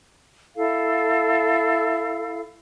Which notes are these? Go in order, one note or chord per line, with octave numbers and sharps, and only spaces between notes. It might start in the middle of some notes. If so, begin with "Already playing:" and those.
E4 A4 F5